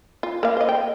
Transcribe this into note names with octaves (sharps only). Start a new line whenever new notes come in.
F4
A#3 F5
C5 D#5
G5